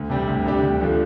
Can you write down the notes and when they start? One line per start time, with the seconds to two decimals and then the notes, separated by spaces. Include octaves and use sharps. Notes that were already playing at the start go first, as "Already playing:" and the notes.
Already playing: D2
0.10 C3 G3 C4
0.27 D2
0.45 C3 G3 D4 G4
0.63 D2
0.81 D3 F3 A3